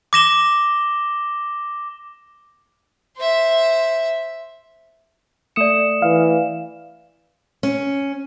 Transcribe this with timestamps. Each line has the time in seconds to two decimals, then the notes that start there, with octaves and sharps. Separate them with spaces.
0.13 D6 A#6 E7 G7
3.16 C5 E5
5.56 A3 D5 D#6 C#7 E7
6.02 E3 F5
7.63 C#4